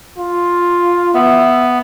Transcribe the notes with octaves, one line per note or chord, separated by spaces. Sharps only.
F4
B3 E5